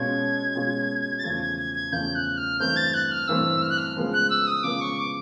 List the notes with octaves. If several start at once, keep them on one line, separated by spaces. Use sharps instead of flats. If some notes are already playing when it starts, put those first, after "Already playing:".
Already playing: B2 G#3 C#4 F4 G#6
B2 G#3 C#4 F4
A6
E2 C#3 F3 A3 G#6
G#6
G#6
G#6
E2 C#3 F3 A3 G6
F#6
F6
G2 E3 A3 C4 G6
A6
F#6
F6
G2 E3 A3 C4 E6
F6
F#6
F6
C#3 F3 G#3 B3
F#6
E6
D#6
C#3 F3 G#3 B3 D6
C#6
D6